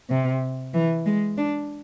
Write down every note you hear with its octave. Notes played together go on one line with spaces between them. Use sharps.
C3
E3
G#3
D4